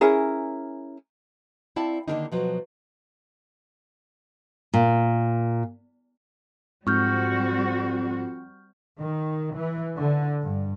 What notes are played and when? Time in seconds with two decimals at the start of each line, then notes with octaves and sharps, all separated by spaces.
0.01 C#4 E4 G#4 A#4
1.76 C4 E4 D5 F5 A5
2.08 D3 D#3 F#3 A#3 D4 D#4
2.32 B2 F3 F#3
4.74 A#2
6.87 F2 G#2 G3 C4 F#4 C#6 F6 G6
8.99 D#3
9.56 E3
9.97 D3
10.43 G2